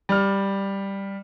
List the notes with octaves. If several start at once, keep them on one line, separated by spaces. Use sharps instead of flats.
G3 F6